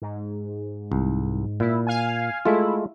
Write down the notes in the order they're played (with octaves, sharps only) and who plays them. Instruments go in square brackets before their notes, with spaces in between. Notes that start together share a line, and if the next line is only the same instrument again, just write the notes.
[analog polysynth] G#2
[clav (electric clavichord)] C2
[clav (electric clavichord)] A#2 [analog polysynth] E4
[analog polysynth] F5 G#5
[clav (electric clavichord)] G#3 A3 F4 [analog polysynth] E4